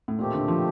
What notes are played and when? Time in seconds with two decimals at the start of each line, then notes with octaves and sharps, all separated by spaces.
0.08 A2
0.19 A#2 D#3 A3 C4 G4
0.34 D3
0.48 F3